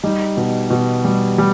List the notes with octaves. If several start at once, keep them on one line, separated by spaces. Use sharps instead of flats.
G3 D#4
B2
B2
G3
G3